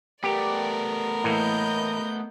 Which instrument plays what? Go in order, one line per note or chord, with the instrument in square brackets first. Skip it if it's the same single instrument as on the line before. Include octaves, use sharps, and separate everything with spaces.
[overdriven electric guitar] A3 B3 [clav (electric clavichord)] G4 [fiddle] A#4 [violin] D5
[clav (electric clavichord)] A2 E3 A#3 [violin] D#5 G6